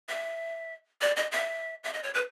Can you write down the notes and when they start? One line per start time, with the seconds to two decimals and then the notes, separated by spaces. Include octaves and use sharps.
0.09 E5
1.01 D5
1.16 D#5
1.32 E5
1.84 E5
1.93 D#5
2.03 C#5
2.14 B4